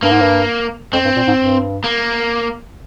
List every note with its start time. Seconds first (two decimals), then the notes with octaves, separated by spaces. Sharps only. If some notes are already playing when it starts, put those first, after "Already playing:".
0.03 G2 A#3
0.11 G#2
0.21 G2
0.93 F2 C4
1.05 G2
1.16 A#2
1.27 G#2
1.38 G2
1.84 A#3